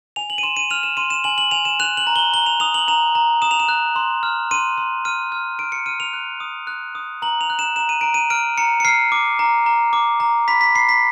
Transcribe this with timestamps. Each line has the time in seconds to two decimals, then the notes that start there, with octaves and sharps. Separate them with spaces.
0.16 G#5 F7
0.30 F#7
0.38 D#7
0.43 C6 E7
0.56 D#7
0.71 F6 F7
0.83 E7
0.97 C6 D#7
1.10 E7
1.24 G#5 F#7
1.38 F#7
1.51 G#5 F7
1.65 E7
1.80 F#6 F7
1.97 F#7
2.07 A#5
2.16 G7
2.33 A#5 G7
2.46 F7
2.60 D#6 F7
2.74 F#7
2.88 A#5 F7
3.15 A#5
3.42 D#6 E7
3.51 F7
3.60 E7
3.69 F#6
3.96 C6
4.23 F6
4.51 C6 D#7
4.78 C6
5.05 F6 D#7
5.32 F6
5.59 F6 D7
5.72 C#7
5.86 F6 D#7
6.00 F7
6.13 F#6
6.40 D#6
6.67 F#6
6.95 D#6
7.22 A#5 F#7
7.41 F7
7.50 F#6
7.59 E7
7.76 A#5 E7
7.89 D#7
8.01 A#5 D7
8.14 D#7
8.30 F6 D7
8.58 A#5 C#7
8.80 C#7
8.85 F6 C7
9.12 D6
9.39 A#5
9.66 A#5
9.93 D6
10.20 A#5
10.48 B5 B6
10.61 B6
10.75 B5 C7
10.89 B6